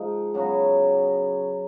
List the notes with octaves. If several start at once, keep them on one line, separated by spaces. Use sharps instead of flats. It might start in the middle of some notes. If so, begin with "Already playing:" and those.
Already playing: F3 G#3 D#4
C#3 F#3 B3 F#4